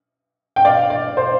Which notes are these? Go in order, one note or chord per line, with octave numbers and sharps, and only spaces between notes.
G5
D5 F5
D5
C5